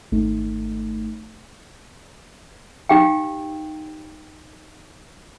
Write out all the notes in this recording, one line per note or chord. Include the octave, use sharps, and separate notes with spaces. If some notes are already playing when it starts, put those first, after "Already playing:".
G#1 A3 D#4
D#4 G4 F5 G5